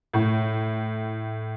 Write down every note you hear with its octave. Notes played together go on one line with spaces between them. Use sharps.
A2